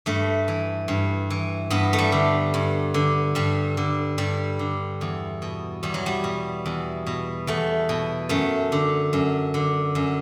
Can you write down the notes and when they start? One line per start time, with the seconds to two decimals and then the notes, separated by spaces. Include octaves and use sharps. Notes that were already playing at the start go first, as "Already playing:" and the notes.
0.06 G2 A3
0.48 E3
0.88 G2
1.30 E3
1.70 G2 B3
1.93 A3
1.99 G3
2.12 D3
2.54 G2
2.94 D3
3.35 G2 G3
3.77 D3
4.18 G2 G3
4.59 D3
5.01 E2
5.42 B2
5.83 E2 G3
5.94 F#3
6.06 G3
6.24 B2
6.66 E2
7.06 B2
7.47 E2 A3
7.89 B2
8.29 F#2 A3
8.72 D3
9.13 F#2
9.54 D3
9.95 F#2